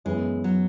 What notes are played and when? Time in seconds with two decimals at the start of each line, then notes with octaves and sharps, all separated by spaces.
0.05 F#2 E3 G#3 B3
0.44 F#3